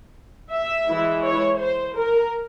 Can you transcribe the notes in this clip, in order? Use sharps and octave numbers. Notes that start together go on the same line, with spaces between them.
E5
E3 G#3 E4
C#5
C5
A#4